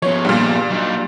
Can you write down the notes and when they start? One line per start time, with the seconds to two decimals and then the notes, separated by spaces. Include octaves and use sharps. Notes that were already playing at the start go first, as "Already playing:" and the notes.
0.02 F3 B3 C#5
0.25 G2 A#2
0.70 F#3 D#4